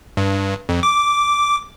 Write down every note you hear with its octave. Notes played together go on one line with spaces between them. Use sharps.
G2
F2
D6